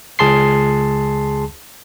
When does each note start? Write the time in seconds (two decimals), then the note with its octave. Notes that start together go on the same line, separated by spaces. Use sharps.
0.19 C#2 G#4 A5 C6 C7